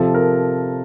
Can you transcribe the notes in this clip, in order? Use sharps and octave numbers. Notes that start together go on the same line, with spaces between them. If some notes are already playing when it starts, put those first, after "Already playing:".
Already playing: C3 F3 A4
A#4